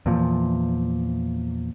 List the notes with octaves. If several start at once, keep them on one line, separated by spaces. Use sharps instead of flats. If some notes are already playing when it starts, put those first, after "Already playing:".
E2 A#2 F3